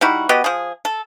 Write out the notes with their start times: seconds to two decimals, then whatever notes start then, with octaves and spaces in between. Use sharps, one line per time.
0.01 G3 D#4 E4 F#4
0.29 B3 F#4 G4 D#5
0.44 F3 G#4
0.85 A4